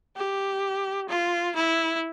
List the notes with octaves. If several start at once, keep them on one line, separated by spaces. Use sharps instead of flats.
G4
F4
E4